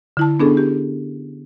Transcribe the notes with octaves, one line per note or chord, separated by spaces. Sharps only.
D3 E4 A5
B3 C#4 D4 G#4 A4
G4